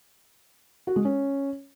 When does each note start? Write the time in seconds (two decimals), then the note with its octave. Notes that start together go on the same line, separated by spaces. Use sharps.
0.87 F#4
0.96 G#3
1.05 C#4